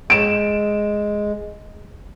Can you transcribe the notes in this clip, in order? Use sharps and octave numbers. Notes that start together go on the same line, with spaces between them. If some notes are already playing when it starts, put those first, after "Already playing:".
G#3 D7 E7